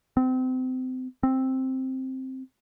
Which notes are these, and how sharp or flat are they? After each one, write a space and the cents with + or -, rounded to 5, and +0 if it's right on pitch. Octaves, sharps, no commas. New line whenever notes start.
C4 -30
C4 +5